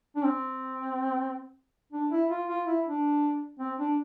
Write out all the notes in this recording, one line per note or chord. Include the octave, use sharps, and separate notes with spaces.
D4
C4
D4
E4
F4
F4
E4
D4
C4
D4